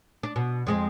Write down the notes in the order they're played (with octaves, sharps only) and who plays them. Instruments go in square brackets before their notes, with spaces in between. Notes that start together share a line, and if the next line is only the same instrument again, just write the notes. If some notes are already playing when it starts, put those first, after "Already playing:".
[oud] D4
B2
F2 G#3 C4